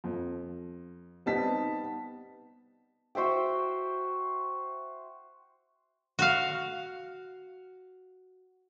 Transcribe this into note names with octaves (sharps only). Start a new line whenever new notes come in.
F2
G3 B3 C4 D#4 A5 B6
F#4 C5 E5 G5
F#4 F5